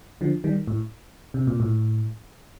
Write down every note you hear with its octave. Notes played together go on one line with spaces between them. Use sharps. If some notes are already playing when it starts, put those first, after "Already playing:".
D3 F3
D#3 G3
A2
C3
A#2
A2